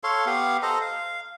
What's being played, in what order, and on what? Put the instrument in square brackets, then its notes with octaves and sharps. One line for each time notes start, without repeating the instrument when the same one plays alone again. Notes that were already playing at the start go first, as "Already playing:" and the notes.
[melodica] A4 C#5 F5 C6
B3 G4 F5
A4 C5 D#5 A#5
F5